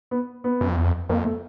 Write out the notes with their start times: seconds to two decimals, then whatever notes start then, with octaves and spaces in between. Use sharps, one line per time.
0.11 B3
0.44 B3
0.61 F#2
0.68 F2
0.76 E2
0.84 F2
1.09 F2 A#3
1.25 A3